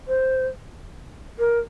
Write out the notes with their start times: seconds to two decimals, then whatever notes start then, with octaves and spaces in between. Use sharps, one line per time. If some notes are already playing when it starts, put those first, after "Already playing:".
0.08 C5
1.39 A#4